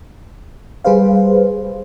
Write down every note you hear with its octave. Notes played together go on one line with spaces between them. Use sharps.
G3 G#4 B4 C5 F5